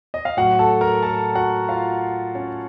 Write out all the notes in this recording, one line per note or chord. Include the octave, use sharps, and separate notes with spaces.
D#5
F5
A2 F#3 F#4 F#5
A4 A5
A#4 A#5
A4 A5
F#4 F#5
F4 F5
C#4 C#5